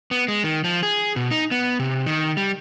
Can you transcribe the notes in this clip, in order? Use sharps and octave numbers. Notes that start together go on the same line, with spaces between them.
B3
G#3
D#3
F3
G#4
B2
D#4
B3
C3
D#3
G3